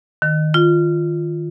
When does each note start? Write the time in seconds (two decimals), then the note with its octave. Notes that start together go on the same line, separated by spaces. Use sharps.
0.22 D#3
0.54 F4